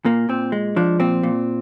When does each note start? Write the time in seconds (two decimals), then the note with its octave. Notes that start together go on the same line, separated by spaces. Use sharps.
0.05 A#2 A#3
0.29 A#2 C4
0.52 G#3
0.76 F3 D4
1.00 A#2 C4
1.23 A#2